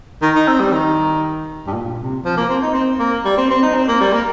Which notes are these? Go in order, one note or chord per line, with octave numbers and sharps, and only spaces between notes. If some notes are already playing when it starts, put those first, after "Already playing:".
D#3
D#4
C4
G3
D#3
G2
A#2
C3
F3
A#3
C4
D#4
C4
A#3
G3
C4
C4
D#4
C4
A#3
G3
A#3